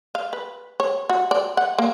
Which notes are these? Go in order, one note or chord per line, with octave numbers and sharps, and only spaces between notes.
F5
B4
C#5
F#4
D5
F#5
A#3